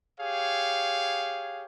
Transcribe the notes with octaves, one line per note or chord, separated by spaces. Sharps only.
G4 G#4 C#5 F5